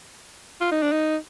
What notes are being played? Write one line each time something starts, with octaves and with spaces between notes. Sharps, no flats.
F4
D#4
D4
D#4